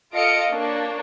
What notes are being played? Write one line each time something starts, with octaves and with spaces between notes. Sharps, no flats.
F4 A4 D#5 F5 C#7 D7
A#3 D4 C#5